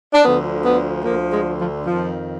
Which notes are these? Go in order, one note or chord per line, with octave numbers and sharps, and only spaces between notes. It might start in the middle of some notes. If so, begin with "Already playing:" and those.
D4
D2 D3 F3 B3
B3
D2 D3 F3 A#3
G#3
F3
F2 D#3 F3